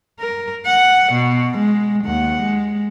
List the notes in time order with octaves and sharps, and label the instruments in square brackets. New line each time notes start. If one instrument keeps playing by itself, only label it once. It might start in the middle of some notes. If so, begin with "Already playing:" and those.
[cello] A#4
F#5
B2
G#3
D#2 F#5
G#3